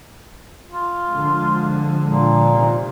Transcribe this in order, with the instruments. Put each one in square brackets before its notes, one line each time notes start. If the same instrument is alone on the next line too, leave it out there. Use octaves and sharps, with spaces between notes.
[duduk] F4
[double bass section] D3 F3 G#3
[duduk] A#2
[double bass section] C3 D#3